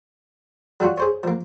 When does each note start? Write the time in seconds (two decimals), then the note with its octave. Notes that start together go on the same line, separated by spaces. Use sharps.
0.80 F#3 G3 F4 F#4
0.98 G#4 C5 C#5
1.23 F3 A#3